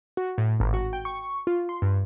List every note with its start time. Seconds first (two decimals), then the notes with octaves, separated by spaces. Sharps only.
0.17 F#4
0.38 A2
0.60 G#1
0.74 F#4
0.93 G5
1.05 C#6
1.47 F4
1.69 C6
1.82 G2